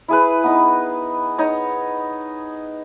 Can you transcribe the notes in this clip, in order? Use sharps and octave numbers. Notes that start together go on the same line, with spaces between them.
E4 G#4 B4
B3 D#4
D#4 C#5